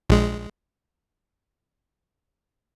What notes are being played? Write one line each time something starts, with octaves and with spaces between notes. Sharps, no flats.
A#1 G#3